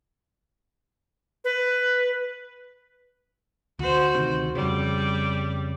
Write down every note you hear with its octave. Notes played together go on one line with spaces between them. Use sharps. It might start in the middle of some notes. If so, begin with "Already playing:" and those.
B4
D2 F#4 C5
D2 C3 D#3
F2 C#3 G3